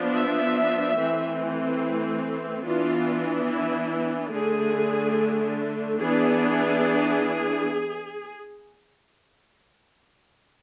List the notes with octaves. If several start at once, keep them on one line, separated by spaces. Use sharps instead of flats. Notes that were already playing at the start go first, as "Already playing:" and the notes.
Already playing: F3 B3 D4
E5
E3 A3 C4
E3 B3 D4 F4
E4
D3 A3 D4 G#4
E3 B3 D4 G#4